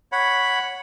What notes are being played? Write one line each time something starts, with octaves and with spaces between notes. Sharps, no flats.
C#5 F#5 B5